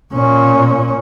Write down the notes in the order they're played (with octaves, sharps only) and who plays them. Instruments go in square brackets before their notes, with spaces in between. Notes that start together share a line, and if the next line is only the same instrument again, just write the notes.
[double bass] A#2 C#4